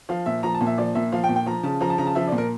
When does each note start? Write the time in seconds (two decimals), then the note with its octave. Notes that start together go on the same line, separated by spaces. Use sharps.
0.09 F3 F5
0.26 A#2 E5
0.43 F3 A#5
0.55 A5
0.61 A#2
0.66 E5
0.78 F3 D5
0.95 A#2 E5
1.12 F3 F5
1.24 G5
1.29 A#2
1.36 G5
1.46 F3 A#5
1.63 C#3 A5
1.81 F3 A#5
1.90 A5
1.98 C#3 A#5
2.07 A5
2.15 F3 E5
2.27 D5
2.32 A#2
2.38 A#4